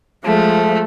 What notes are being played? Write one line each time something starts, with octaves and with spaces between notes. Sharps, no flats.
F3 G#3 A3